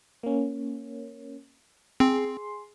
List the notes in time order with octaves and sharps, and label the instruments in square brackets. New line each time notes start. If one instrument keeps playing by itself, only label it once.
[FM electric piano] A#3 C#4
[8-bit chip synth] C4 [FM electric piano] G#4 C6